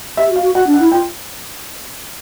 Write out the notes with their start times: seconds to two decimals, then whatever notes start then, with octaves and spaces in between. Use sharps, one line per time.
0.17 G4 E5
0.30 F#4
0.36 F5
0.42 F#4
0.55 F#4 F#5
0.67 D4
0.74 F#5
0.80 E4
0.92 F4 G5